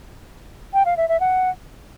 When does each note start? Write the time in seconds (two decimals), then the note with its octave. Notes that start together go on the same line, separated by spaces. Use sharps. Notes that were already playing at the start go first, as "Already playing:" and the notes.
0.74 G5
0.85 F5
0.97 E5
1.09 E5
1.20 F#5